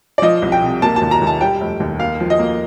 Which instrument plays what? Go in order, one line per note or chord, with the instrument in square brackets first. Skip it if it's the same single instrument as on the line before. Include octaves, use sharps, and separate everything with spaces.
[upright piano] D5
F3 D#5
C2
G5
C3
A#3 A5
A5
D#2
A#5
D#2
A5
G3 G5
F1
D#2
A#3 F5
F3
D#5
A#3